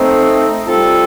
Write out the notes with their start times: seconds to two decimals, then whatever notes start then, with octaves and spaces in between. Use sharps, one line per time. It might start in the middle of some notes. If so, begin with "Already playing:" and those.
Already playing: A3 C4 D#4
0.66 G3 C4 F4 A4